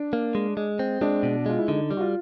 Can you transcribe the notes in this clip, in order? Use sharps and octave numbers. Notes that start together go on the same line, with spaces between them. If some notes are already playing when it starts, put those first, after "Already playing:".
Already playing: D4
A#3
G#3
G#3
C4
G#3 D4
B2
G#3 F4
E4
D3 D#4
G3
F#4
F4